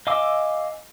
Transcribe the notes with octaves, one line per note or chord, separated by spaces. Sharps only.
D#5 F5 G#5 D6 E6